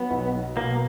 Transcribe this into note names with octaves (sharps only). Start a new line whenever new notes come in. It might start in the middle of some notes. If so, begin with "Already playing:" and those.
Already playing: F#3 B3
B1
F#3
B2 A#3